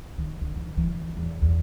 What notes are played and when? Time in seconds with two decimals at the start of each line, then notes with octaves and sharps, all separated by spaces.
0.18 D#3
0.41 D3
0.56 E3
0.77 E3
0.92 D3
1.17 E2
1.42 E2